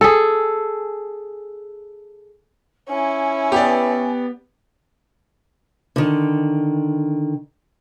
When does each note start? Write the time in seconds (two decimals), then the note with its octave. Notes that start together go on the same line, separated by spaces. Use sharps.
0.01 G#4 A4
2.89 C#4 E4 G#5
3.52 B3 G4 D5
5.96 D3 D#3